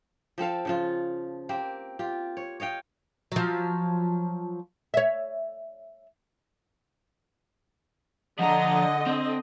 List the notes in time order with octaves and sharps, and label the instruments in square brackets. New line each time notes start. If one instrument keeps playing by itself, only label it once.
[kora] F3 C4 A4 F5
C#3 F3 F4
A#3 C4 G4
F4 G4
C#5
C#5 D#5 F5 G5
[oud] F3 F#3
C#5 E5
[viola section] D3 D#5 [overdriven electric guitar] F3 A#5 [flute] F#5
[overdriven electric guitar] C4